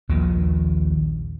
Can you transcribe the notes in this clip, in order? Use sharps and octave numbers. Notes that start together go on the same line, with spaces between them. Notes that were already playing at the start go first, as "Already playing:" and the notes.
A#1 D#2 A#2 D#3